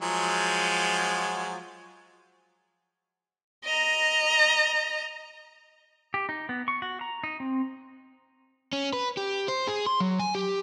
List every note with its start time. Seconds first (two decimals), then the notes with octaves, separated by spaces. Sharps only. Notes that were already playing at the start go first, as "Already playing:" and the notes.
0.02 F3 F#3 G#3
3.65 D#5 A#5
6.14 G4
6.29 D#4
6.49 B3
6.68 C#6
6.82 F#4
7.01 A#5
7.24 D#4
7.40 C4
8.73 C#4
8.93 B4
9.17 G4
9.48 C5
9.67 G#4
9.86 C6
10.00 F#3
10.19 G#5
10.35 G4